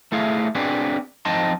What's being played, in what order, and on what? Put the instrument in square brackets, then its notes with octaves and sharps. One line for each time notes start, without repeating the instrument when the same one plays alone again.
[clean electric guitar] A3 E4 G#4 F5
C4 D4 F#4 G#4 B4
F3 C4 D#4 D#5 A5 C6